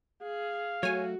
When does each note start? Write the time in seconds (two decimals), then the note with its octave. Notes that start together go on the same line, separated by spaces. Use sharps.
0.22 G#4 F5
0.83 F#3 A3 F#4 C#5 G#5